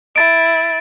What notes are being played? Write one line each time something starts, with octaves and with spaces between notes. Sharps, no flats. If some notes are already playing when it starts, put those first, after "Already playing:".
E4 A6 D7